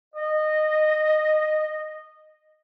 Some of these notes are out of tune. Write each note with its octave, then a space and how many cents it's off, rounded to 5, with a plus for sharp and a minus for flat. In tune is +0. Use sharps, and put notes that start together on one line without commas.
D#5 -15